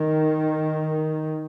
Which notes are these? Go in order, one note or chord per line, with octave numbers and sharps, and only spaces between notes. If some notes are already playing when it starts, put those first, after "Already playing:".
Already playing: D#3